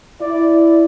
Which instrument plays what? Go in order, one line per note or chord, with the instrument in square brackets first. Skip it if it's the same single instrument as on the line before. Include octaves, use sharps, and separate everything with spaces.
[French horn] E4 [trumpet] D5